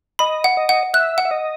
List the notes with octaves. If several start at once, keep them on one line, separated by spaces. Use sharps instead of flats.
D#5 B5
F#5
D#5
F#5
E5 F#6
F#5
E5
D#5